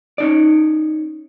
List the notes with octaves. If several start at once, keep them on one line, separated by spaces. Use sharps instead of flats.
C#4 D#4 D5